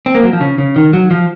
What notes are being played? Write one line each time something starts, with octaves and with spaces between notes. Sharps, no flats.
C4
A#3
F#3
F3
C#3
C#3
D#3
F#3
F3